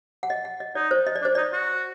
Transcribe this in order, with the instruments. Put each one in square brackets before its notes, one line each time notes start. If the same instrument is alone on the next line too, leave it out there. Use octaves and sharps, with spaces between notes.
[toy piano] F#5
D#5
F#5
D#5
[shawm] D#4 [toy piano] D5
[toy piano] C5
D#5
D5
[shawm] D4
[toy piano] C5
[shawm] D#4 [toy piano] D5
[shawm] F#4